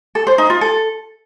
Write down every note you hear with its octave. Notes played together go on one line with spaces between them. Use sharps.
A4
C5
D#4
F4
A4